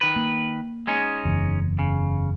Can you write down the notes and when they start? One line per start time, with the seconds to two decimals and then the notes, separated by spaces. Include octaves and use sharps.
0.01 D#3 B4
0.16 A#3
0.87 G#3 C#4 D#4
1.25 F#1 E2
1.79 C#3